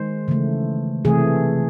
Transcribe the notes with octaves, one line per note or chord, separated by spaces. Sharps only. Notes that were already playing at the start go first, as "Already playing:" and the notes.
Already playing: D#3 G#3 C5
C#3 E3 A3
C3 E3 A3 G#4